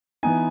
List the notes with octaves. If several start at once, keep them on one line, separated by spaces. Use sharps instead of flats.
E3 B3 D#4 G#5